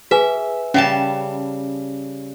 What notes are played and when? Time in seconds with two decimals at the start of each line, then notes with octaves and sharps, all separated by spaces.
0.11 G#4 B4 E5 G#5
0.74 C#3 G3 C#4 A5